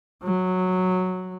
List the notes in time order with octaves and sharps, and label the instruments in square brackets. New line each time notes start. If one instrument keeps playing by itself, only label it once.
[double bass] F#3